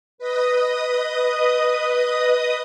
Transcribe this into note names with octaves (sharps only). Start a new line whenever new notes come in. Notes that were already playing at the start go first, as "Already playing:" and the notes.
B4 D#5 D#6